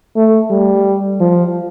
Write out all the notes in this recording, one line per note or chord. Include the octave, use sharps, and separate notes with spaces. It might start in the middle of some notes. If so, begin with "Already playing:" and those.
A3
G3
F3